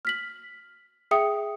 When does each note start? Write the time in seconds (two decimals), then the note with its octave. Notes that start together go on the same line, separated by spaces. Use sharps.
0.05 F6 B6 F#7
1.11 G#4 E5 G5 D#6 C#7